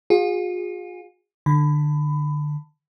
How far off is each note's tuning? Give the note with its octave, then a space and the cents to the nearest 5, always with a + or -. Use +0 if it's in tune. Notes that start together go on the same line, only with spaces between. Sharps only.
F4 +40 G#4 -25
D3 +20 B5 +20